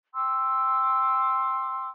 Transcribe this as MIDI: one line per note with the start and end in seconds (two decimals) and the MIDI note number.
0.13 1.88 79
0.13 1.88 84
0.13 1.88 86
0.13 1.88 88